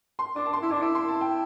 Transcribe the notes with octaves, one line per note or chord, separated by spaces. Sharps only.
C6
D4 D6
A5
C6
E4
D4 D6
E4 D6
C6
A5
G5